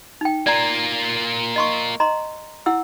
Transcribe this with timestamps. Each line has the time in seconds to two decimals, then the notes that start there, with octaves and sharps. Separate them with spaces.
0.21 D#4 G5
0.47 A#3 F4 D5 A#5
1.56 D#5 C6 C#6
2.00 D#5 A#5 C6
2.66 E4 F#5 E6